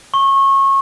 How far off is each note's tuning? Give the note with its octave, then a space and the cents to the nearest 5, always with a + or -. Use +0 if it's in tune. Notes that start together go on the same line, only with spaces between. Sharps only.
C#6 -25